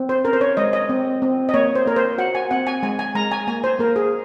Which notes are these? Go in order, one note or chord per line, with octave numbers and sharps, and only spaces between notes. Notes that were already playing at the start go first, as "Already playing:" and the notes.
Already playing: C4
C5
C#4 A#4
C5
C#5
G#3 D#5
D#5
C4
C4
D#5
A#3 C#5
C5
A#3 A#4
C5
F#4 F#5
G#5
C4 F#5
G#5
G#3 G#5
G#5
G#3 A#5
G#5
A#3 G#5
C5
A#3 A#4
G#4